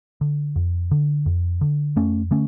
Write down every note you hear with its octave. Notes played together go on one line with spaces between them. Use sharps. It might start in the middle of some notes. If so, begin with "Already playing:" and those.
D3
F2
D3
F2
D3
F2 A3 C#4
D3 A3 C#4